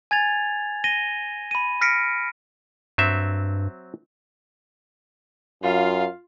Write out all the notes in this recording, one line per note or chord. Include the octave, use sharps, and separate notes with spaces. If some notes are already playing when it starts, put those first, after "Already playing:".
G#5 G#6 A6 F7
A#6 D#7 G7
B5 D#7
F6 A#6 B6 C#7 D7
G2 F#3 C4 E5
F#2 F4 F5